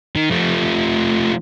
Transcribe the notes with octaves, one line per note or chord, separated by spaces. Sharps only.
D#3
F3 A3